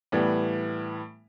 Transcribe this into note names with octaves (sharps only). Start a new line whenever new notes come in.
A2 E3 G3 B3